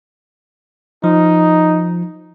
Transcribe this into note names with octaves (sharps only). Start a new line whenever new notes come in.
F3 D#4